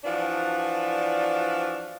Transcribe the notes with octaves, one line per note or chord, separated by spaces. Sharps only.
E3 F3 D4 F#4 D5